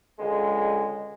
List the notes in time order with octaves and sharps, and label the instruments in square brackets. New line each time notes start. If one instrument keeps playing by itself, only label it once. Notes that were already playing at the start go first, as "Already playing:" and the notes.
[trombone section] C#2 D3 G#3